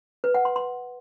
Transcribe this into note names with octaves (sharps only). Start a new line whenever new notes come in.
B4
F#5
C6
C6